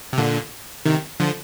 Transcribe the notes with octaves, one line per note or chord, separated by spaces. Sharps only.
C3
A#2 D3
C3 D#3
D3 F3